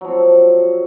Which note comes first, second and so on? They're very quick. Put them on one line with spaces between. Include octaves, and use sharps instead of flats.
F#3 F3 C4 A4